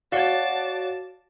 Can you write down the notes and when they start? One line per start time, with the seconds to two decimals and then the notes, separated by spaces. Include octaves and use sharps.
0.12 F#4 C#5 D5 F5 F#5 A5 D6 A6